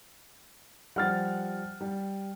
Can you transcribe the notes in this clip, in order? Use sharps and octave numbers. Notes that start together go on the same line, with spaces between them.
F3 G3 F#5 F6 A6
G3